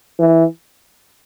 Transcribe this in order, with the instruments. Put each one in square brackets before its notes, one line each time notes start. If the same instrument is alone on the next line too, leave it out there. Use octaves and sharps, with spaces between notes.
[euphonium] E3